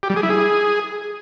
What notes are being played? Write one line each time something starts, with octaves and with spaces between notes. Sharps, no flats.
G4
G3
G#4
E4
G#4